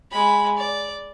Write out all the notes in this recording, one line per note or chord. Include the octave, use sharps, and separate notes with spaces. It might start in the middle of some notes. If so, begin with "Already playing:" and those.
G#3 B5
D5